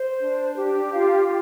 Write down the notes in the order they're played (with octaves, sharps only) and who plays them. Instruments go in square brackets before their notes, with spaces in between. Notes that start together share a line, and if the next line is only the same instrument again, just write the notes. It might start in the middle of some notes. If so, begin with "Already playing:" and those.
Already playing: [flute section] C5
D4
G4
F4 F5